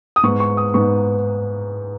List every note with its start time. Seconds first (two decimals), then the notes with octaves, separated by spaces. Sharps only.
0.16 D#6
0.23 G#2 G#3 B3 D#4 C#6
0.40 C#6
0.57 D#6
0.74 G#2 G#3 B3 D#4 C#6